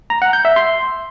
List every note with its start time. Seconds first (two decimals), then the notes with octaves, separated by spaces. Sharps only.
0.10 A#5
0.22 F#5
0.33 G6
0.45 E5
0.56 C6